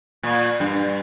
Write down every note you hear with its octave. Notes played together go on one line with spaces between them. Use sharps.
A#2
G2